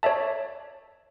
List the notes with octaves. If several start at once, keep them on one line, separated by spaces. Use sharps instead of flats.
C#5 D5 E5 A5